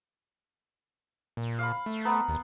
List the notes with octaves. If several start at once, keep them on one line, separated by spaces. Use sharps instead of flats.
A#2
F5 B5
A3
B3 A#5 B5
D#2